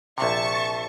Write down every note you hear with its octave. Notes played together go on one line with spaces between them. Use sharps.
A#1 C3 E5 A5 C#6